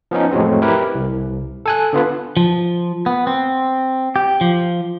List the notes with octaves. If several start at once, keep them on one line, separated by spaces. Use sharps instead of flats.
F3 B3 C#4 D#4
F2 A2 F#3 G#3 C4
E4 G4 A#4 B4
C2
A4 G#5 F#6
D3 B3 F4 B4
F3
B3
C4
G4
F3